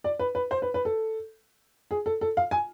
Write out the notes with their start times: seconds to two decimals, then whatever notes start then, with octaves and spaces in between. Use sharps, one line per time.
0.04 D5
0.19 B4
0.35 B4
0.51 C5
0.62 B4
0.74 B4
0.85 A4
1.91 G#4
2.06 A4
2.21 A4
2.37 F5
2.51 G#5